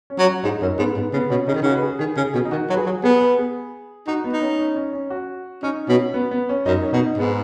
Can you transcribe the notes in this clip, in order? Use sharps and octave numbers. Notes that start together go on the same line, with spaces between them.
C#4
F#3
F#4
G#2 D#4
F#2 C#4
G#2 B3
G#2 B3
C#3 B3
B2 C#4
C#3 D#4
D#3
C#3 F#4
B4
G#4
D#3 G#4
C#3 G#4
B2 G#4
D#4
D#3 F#4
F#3
B4
G#4
F#3
B3 G#4
B4
G#4
D#4 F#4
B3
D#4
C#4
C#4
C#4
C#4
F#4
C#4 D#4
B2 C#4
B3
B3
C#4
F#2 D#4
C#4
B2 D#4
G#2 B3